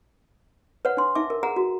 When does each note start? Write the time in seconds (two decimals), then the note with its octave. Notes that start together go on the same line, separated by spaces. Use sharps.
0.85 B4 C#5 F#5
0.97 D4 C6
1.15 D#4 E5 D6
1.30 A#4
1.43 G#4 F#5 A#5
1.56 F#4